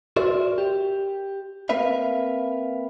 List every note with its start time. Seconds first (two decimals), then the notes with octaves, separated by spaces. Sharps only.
0.16 F#4 A#4 C5 D5 E5
0.58 G4
1.69 A#3 C4 A#4 B4 E5 F5